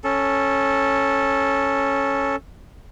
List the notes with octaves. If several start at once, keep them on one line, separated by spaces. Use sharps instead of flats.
C#4 A4